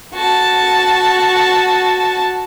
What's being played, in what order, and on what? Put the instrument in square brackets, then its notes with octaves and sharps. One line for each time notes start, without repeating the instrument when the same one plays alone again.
[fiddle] F#4 A5